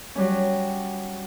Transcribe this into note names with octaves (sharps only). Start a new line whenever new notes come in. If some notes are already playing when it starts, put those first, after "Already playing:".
F#3 G3 C#4